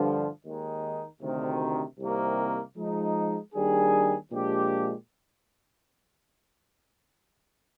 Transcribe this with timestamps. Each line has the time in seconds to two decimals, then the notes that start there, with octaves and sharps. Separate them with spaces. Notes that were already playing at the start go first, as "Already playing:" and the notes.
Already playing: G2 D3 F3
0.44 D#2 D#3 G#3 D#4
1.21 D2 C3 D#3
1.99 C2 C3 D#3 A#3
2.76 F3 G#3 D#4
3.54 D#2 D#3 G3 D4 G#4
4.32 A#2 F3 G#3 D4 G4